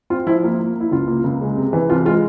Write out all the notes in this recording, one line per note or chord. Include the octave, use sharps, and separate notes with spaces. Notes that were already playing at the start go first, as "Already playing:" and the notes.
C4 F4
F3 E4
A#3 F4
A#3
A#3 E4
C#2 F4
A#3
C#2
G#3
C3
E3
C2 F4
G#3 F4